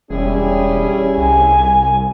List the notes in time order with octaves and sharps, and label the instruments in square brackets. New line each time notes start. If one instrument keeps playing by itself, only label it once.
[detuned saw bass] E1 [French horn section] G3 C#4 [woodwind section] E4 G#4
[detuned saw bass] C2 [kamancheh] G#5